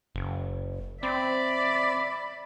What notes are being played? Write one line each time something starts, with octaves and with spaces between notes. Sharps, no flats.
F#1
C4 D5 E5 B5